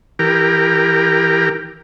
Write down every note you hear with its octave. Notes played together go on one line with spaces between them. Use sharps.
E3 G4 A#4